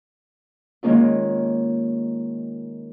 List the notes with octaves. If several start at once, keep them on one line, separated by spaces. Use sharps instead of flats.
D#3 G#3 A#3 C#4 F4